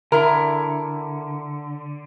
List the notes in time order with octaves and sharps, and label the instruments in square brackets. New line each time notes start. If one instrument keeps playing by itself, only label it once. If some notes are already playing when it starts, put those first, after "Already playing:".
[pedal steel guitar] D3 [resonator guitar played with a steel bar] E4 A#4